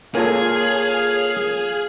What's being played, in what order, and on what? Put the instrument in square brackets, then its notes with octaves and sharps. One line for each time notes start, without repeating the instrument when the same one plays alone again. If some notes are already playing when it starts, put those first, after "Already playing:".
[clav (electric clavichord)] A#3 F4 A4 [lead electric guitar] G#4 [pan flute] C#5 [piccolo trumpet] F5